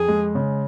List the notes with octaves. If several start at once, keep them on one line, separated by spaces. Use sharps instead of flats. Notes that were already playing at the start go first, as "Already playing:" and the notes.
Already playing: F2 G#4
G#3
C#3